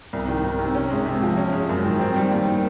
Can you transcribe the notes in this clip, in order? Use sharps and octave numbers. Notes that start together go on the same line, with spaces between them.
C2
D#3
C2
C3
C#4
G#3
C3
F3
C#4
G#3
F#2
D#3
C4
G3
D#2
D#3